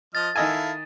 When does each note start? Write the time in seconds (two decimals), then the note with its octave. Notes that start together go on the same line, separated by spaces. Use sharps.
0.15 F3 D#5 F6 A6
0.36 D#3 E4 A4 D#5 F5 G#5